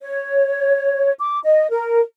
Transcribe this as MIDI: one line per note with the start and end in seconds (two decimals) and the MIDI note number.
0.02 1.12 73
1.19 1.40 86
1.44 1.69 75
1.70 2.01 70